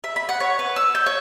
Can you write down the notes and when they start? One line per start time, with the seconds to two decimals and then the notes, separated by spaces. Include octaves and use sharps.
0.04 E5
0.16 B5
0.29 F#5
0.40 C#5
0.59 B4
0.76 E6
0.95 G6
1.06 C#5